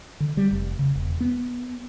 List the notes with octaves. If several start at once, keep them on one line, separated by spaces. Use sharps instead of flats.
D3
G3
F1
C#3
E1
B3